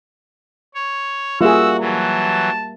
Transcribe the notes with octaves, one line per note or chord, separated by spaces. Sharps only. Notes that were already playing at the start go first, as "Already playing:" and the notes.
C#5
G3 A#3 F4 F#4 G#4 E5 E6
E3 F#3 A5